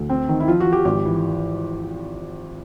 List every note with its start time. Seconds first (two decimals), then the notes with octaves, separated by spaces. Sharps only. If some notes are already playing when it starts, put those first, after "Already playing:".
Already playing: D2
0.09 C4
0.29 D#3
0.40 E4
0.48 F3 F4
0.60 F#4
0.66 F3
0.73 G4
0.85 G#1 G4
1.05 E3